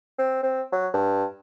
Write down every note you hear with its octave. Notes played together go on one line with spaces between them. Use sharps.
C4
C4
F#3
G2